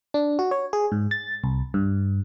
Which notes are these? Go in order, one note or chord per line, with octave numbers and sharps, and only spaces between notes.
D4
F#4
C#5
G#4
G#2
A6
C2
G2